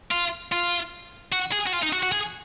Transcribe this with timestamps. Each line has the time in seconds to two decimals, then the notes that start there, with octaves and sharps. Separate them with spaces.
0.11 F4
0.52 F4
1.32 F#4
1.52 G#4
1.66 F#4
1.73 F4
1.82 D#4
1.93 F#4
2.03 F#4
2.12 G#4